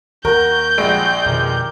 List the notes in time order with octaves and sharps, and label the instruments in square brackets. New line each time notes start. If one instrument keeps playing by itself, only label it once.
[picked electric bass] D#2 [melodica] F#4 [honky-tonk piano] A#4 [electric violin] G6
[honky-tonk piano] A#1 G#3 D7 [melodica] G3 C4 F#4
[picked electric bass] F2 B2 D#3 [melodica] G4 A#4